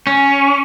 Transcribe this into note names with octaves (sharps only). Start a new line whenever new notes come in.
C#4